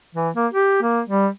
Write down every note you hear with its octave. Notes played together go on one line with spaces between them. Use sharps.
E3
A#3
G4
A#3
G3